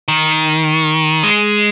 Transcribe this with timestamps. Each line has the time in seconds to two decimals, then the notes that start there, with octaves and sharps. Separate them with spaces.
0.08 D#3
1.23 G#3